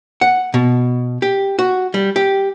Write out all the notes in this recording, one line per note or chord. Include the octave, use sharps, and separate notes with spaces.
F#5
B2
G4
F#4
G3
G4